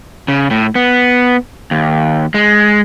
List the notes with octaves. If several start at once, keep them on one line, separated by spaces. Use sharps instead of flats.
C#3
A2
B3
D#2
G#3